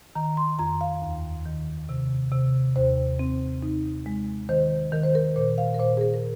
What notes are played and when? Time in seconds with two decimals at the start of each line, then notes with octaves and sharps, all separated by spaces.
0.15 D#3 A#5
0.37 C6
0.59 F2 A#5
0.81 F5
1.02 D#2
1.46 D#3
1.89 C3
2.32 C3
2.76 D#2 C5
3.19 C4
3.63 D#4
4.06 G#3
4.49 D#3 C5
4.92 D#3 A#4
5.03 C5
5.15 A#4
5.36 A#2 C5
5.58 F5
5.74 A#4
5.79 A#2 C5
5.97 G#4
6.01 A#4
6.14 A#4